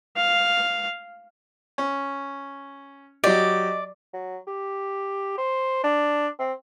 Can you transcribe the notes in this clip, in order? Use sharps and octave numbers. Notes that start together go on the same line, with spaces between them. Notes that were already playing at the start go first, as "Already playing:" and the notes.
F5
C#4
F#3 G4 D5 D#5
F#3
G4
C5
D4
C4